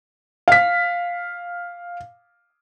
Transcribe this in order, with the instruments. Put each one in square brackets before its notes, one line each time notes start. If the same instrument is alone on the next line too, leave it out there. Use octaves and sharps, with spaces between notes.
[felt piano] F5 B6